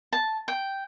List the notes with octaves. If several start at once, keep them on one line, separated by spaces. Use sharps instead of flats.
A5
G5